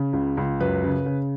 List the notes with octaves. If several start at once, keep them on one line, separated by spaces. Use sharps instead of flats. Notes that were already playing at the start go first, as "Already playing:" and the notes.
Already playing: C#3
C#2
C#2
F#2 B4
C#3
C#3